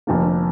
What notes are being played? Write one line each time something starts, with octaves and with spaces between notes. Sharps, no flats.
F1 F2 D3 F3 A#3